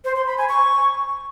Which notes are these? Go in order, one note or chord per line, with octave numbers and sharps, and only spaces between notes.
C5
C6
B5
G#5
C#6